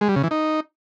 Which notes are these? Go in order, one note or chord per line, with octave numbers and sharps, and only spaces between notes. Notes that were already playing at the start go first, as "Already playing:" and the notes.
G#3
G3
C#3
E3
D#4